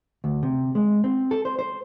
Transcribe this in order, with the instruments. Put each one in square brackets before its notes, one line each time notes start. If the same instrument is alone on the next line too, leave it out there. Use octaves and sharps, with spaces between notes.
[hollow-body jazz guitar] D2
C3
G#3
C4
A4
C5
C5